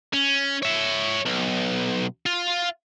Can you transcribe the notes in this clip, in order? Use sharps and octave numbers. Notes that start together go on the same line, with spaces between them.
C#4
C#5 E5
B1
F4